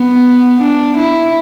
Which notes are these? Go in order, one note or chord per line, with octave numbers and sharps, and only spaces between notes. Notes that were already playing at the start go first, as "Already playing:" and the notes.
Already playing: B3
D4
E4